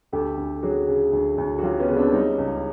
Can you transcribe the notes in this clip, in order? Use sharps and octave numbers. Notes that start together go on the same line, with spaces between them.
D2 G4 A4
D2
F#3 F#4 G#4
C#3
D2
D2
F#4
F#3 F4 G4
B3 C#4
C#3
C4 D4
G3 C#4 D#4
C#2